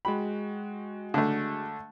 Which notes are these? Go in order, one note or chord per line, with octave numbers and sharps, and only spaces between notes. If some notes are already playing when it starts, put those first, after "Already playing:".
G#3 F#4 G5 B5
D3 A3